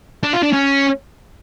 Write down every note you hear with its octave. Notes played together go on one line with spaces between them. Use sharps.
D4
F4
D4
C#4